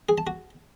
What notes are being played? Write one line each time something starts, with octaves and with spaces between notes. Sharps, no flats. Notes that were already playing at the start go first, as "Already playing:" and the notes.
G#4
A5
F#4